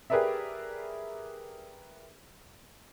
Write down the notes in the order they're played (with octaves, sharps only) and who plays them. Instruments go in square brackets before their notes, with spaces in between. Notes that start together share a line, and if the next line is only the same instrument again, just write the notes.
[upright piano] G4 G#4 A#4 B4 D5 E5